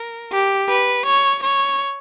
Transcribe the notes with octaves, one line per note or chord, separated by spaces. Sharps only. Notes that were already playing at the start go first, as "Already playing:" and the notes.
Already playing: A#4
G4
B4
C#5
C#5